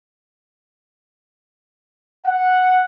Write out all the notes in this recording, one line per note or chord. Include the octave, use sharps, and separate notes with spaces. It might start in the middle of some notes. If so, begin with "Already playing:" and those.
F#5